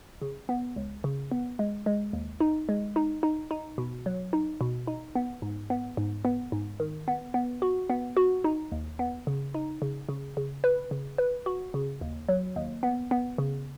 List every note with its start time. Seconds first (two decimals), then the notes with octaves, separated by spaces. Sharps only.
0.22 C#3
0.49 B3
0.76 C#2
1.04 C#3
1.32 B3
1.59 G#3
1.86 G#3
2.13 D#2
2.41 D#4
2.69 G#3
2.96 D#4
3.23 D#4
3.51 D#4
3.78 B2
4.06 F#3
4.33 D#4
4.61 B2
4.87 D#4
5.15 B3
5.42 G#2
5.70 B3
5.97 G#2
6.25 B3
6.52 G#2
6.80 D#3
7.08 B3
7.34 B3
7.62 F#4
7.90 B3
8.17 F#4
8.44 D#4
8.72 D#2
8.99 B3
9.27 C#3
9.54 D#4
9.82 C#3
10.09 C#3
10.37 C#3
10.64 B4
10.91 C#3
11.18 B4
11.46 F#4
11.74 C#3
12.01 D#2
12.29 F#3
12.56 D#2
12.83 B3
13.11 B3
13.38 C#3